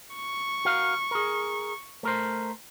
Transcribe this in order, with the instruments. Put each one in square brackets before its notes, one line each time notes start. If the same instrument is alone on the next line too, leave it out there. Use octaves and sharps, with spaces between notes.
[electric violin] C#6
[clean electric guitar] F#4 A#4 F5
G#4 A#4
A3 A#4 C5